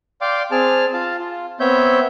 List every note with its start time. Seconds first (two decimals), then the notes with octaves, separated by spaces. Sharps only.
0.21 D5 F5 G5 C6 D6
0.51 C4 G#4 A5 F6
0.93 F4 F5 A5
1.19 F4
1.60 B3 C4 C#5 E5 G6